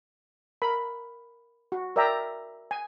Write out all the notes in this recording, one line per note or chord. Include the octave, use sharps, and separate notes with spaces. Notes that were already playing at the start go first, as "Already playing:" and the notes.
A#4 B5
F#4
A#4 D5 E5 G5 A#5
G#5